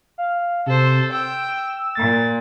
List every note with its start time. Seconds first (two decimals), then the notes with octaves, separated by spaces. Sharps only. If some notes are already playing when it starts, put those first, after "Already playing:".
0.18 F5
0.66 C3 A4 C5
1.13 G5 E6
1.95 A#2 A6